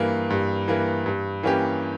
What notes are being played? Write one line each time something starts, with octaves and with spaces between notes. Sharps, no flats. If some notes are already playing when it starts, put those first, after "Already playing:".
Already playing: G2 E3 A#3
G2
E3 A#3
G2
E3 A#3 C#4 G4